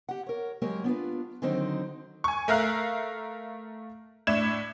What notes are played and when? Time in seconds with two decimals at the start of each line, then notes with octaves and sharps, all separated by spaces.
0.09 G4 F#5
0.27 A#4 C#5
0.62 F#3 G#3 A#3 G4 A#4 C#5
0.84 B3 D4 F4 B4
1.42 D3 D#3 F#3 C4 D#4 C5
2.24 G#5 C#6
2.48 A3 A#4 E5 F5 F#6 C7
4.27 A2 D4 E4 G#6 E7